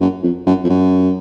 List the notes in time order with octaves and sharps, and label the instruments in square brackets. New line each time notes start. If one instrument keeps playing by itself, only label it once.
[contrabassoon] F#2
F2
F#2
F2
F#2